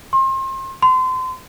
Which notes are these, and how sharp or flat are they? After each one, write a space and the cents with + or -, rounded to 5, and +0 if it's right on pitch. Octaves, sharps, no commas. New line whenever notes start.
C6 +35
C6 -30